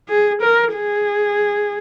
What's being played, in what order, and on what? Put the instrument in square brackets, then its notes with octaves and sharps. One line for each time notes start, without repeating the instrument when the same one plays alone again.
[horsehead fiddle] G#4
A#4
G#4